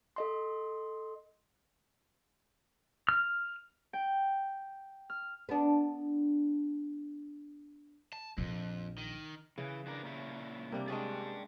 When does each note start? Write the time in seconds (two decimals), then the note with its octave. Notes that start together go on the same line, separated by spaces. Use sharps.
0.16 A4 D#5 C6
3.09 F6
3.93 G5
5.10 F6
5.49 B3 D4
8.13 A5
8.38 A#1 F2
8.98 D#3
9.58 C#3 E3
9.87 E3 D4 A#4
10.03 A#2 C#4 E4
10.72 C3 G3 A#3 D4
10.88 G#3 C#4 G#4 D5 G5 A5